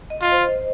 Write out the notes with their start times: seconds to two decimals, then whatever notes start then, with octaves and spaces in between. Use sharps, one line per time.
0.10 D#5
0.22 F4
0.32 C5